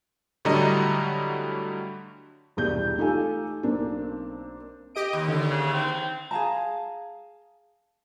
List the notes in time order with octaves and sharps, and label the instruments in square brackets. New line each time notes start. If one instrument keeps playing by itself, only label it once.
[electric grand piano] A2 D3 F#3 G3 D#5 A#5
[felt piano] E1 C2 G6
A3 D#4 F4 G4 A4 G#5
B1 A#3 C4 D4
[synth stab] G4 D#5 D7
[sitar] D#2
[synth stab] D3
[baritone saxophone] C#3
C4
[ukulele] G#4 F5 A5 A#5